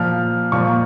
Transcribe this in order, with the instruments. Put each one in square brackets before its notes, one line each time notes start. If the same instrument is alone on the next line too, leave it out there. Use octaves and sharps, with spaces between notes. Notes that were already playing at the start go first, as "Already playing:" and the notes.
Already playing: [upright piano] A#2 F3 F6
A#2 F3 C#6